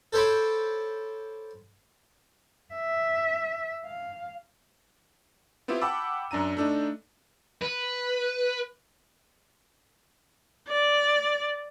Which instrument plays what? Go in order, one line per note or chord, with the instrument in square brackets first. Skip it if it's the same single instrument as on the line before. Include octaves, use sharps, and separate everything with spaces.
[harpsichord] A4 C5 C#5 B5 D6
[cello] E5
F5
[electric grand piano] B3 C4 E4 F4 G4
F#5 G5 A5 B5 D6 E6
F#2 D4 A#5 D#7
A3 D4 D#4
[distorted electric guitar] B4
[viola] D5